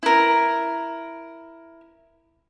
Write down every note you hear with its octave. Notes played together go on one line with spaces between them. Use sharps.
E4 A#4